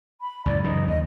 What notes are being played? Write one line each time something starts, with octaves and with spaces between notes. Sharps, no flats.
B5
C#2 F#2 A2 D5
F#2 C#3 E3 D#4
D#2 D#5